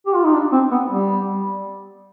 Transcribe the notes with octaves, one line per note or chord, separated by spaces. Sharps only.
G4
F4
D#4
D4
C4
B3
G3